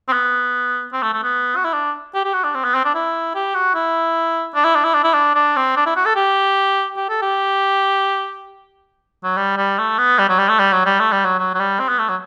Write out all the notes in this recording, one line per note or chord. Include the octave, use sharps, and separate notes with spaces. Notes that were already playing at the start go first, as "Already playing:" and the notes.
C4
B3
C4
A3
A3
B3
F#4
E4
D4
G4
G4
F#4
D4
C4
B3
C4
D4
E4
G4
F#4
E4
D4
E4
D4
E4
D4
E4
D4
D4
C4
D4
E4
F#4
A4
G4
G4
A4
G4
F#3
G3
G3
A3
B3
G3
F#3
G3
A3
G3
F#3
G3
A3
G3
F#3
F#3
F#3
G3
C4
B3
A3
F#3